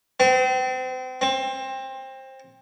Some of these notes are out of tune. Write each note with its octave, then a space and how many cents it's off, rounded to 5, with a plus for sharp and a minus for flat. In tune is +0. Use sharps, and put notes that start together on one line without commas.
C4 -35
C4 +20